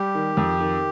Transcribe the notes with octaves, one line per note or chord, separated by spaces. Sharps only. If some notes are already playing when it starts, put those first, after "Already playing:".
Already playing: G3 G4
D#3
F2
D#3